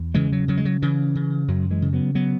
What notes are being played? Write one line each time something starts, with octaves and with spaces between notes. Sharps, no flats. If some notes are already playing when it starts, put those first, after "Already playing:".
Already playing: E2
C#3 E3 G#3
F#3
C#3 F#3
G#3
F#3
C#3 E3
C#3
F#2 F#3
E3 G#3
C#3
F#3 B3
F#3 B3